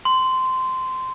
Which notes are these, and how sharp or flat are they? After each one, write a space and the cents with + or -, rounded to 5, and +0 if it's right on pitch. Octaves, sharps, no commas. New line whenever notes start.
C6 -15